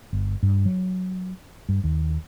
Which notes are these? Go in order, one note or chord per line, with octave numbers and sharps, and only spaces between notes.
G1
G2
F#3
G2
D#2